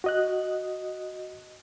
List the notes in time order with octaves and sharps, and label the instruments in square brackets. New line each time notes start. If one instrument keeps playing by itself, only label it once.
[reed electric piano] F#4 D#5 F#6